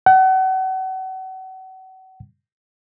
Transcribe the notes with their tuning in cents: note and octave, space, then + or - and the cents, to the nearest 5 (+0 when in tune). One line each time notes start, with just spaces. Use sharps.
F#5 +35